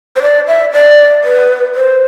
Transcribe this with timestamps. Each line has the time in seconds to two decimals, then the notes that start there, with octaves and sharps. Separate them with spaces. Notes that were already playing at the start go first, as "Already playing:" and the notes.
0.16 C5
0.22 D5
0.47 E5
0.73 D5
1.24 B4
1.75 C5